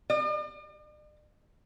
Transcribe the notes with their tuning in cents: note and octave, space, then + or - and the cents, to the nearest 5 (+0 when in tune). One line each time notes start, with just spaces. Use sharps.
D5 +45